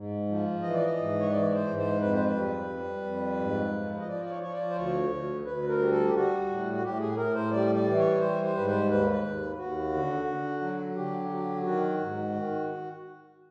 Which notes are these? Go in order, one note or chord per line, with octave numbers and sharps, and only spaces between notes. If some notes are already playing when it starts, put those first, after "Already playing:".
Already playing: G#2
F3
E3 D#5
D5
D#5
G#2
C#5
E3 D5
C5
G#2
C5
F2 B4
C5
B4
G3
G3
F2
G#2
F3
D#5
F3 D5
D5
C#5
F3 C#5
D5
C5
D2 C#5
D2
D2 B4
A#4
G3
A4
G4
G3 F#4
A2
F#4
A2 G4
G#4
A2 A#4
C5
G3 D5
D5
E3
C#5
G3 C5
C5
G#2 B4
C5
D#2 B4
D#2
D#2 F#4
D3
D3
F#3
D3 G4
F#3
D#3 F#4
G#2
D#3